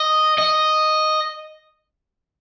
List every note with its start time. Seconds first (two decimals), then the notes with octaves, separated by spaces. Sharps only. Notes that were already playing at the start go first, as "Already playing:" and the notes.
Already playing: D#5
0.38 D#5